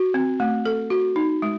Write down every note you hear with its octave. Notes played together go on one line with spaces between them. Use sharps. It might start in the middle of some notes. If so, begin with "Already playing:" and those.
Already playing: F#4
C4
A3
A4
F#4
D#4
G#3